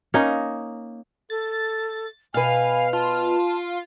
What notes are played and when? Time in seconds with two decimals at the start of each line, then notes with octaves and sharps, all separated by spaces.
0.14 A#3 C#4 D#4 D#5
1.30 A4 A6
2.34 B2 B4 F5 G#5
2.93 F4 A5